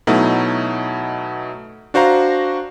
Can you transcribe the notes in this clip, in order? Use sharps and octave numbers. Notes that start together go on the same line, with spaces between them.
B2 F#3 A3 D#4 E4
D4 F#4 C5 F5 A#5